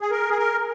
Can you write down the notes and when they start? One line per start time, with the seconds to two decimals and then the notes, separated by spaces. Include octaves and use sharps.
0.01 G#4
0.11 A#4
0.30 G#4
0.38 A#4